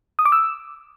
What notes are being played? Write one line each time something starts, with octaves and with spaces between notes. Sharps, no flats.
D#6
D6
E6